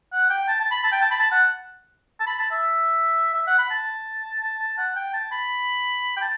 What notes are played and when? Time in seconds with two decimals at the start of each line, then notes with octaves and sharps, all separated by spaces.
0.12 F#5
0.30 G5
0.48 A5
0.60 A5
0.71 B5
0.84 A5
0.92 G5
1.02 A5
1.11 B5
1.20 A5
1.31 F#5
2.20 A5
2.27 B5
2.39 A5
2.51 E5
3.34 E5
3.47 F#5
3.58 B5
3.70 A5
4.78 F#5
4.96 G5
5.14 A5
5.32 B5
6.17 G5
6.22 A5